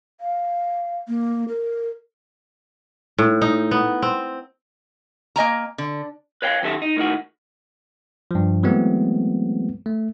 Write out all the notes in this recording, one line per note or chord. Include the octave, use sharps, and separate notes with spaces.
F5
A#3
A#4
A2
D#4
B3
C4
A#3 D#5 G#5 A#5
D3
B4 C#5 F5 G5
F#2 D#3 G4 A4 E5
D#4
A2 D#3 D#4 F#4
G2 F3
E3 F#3 G#3 A3 B3 C4
A3